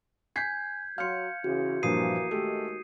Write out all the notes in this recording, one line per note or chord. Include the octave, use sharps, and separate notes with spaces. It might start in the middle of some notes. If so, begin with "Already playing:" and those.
G#5 G6 G#6 B6 C7
F#3 F5 C6 F6 G6 C#7
C#3 E3 F#4
G2 A#2 E3 F3 A#3 D#6 C7 D#7
D#2 D#3 G#3 A3 G4